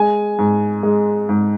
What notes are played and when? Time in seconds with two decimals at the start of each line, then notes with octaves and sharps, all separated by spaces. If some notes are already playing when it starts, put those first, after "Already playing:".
Already playing: G#3 G#5
0.39 G#2
0.83 G#3
1.29 G#2